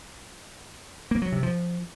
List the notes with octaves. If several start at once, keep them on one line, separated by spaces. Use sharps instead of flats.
A#3
F#3
C3
F3